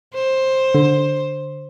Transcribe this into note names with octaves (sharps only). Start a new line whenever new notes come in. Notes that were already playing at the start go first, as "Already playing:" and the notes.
C5
D3